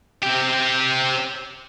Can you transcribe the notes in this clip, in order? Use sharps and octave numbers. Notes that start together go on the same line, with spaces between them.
C4 G4